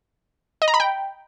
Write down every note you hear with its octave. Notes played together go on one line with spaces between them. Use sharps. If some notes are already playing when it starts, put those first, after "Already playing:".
D#5
A#5
B5
G5